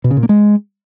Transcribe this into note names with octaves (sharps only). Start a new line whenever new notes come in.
B2
C#3
A#2
A#3
G#3